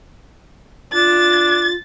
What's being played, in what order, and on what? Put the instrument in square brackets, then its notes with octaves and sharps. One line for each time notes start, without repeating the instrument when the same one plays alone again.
[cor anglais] D4 [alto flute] F4 [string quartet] A6